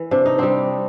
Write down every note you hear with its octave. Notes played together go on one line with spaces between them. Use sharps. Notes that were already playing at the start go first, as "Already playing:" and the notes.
Already playing: E3
C3 D4
D#4
G3 C4 D4